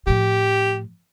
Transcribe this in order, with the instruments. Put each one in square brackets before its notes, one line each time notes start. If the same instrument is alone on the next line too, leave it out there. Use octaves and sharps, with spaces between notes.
[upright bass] A2 F3 [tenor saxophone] G4